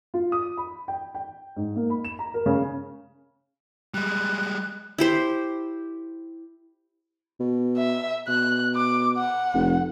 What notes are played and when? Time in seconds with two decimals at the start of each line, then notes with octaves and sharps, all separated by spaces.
0.14 F4
0.32 D#6
0.57 B5
0.88 G5
1.15 G5
1.56 G#2
1.76 A#3
1.90 B5
2.05 E7
2.19 A#5
2.34 A#4
2.46 C#3
3.94 G3 G#3 F#6
4.98 E4 G4 C5
7.40 B2
7.77 E5
8.28 B2 F#6
8.76 D6
9.18 F#5
9.54 F1